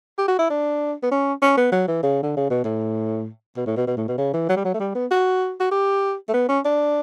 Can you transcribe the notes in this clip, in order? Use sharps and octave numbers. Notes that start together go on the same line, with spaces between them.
G4
F#4
E4
D4
B3
C#4
C#4
B3
F#3
E3
C#3
D3
C#3
B2
A2
B2
A2
B2
B2
A2
B2
C#3
E3
F#3
G3
F#3
A3
G3
B3
F#4
F#4
G4
A3
B3
C#4
D4